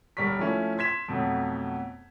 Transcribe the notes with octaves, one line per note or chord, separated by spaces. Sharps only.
B1 G3 A#4 C#6 B6
F3 A3 C#4 E4
C6 G#6 B6 E7
F2 B2 F#3 A3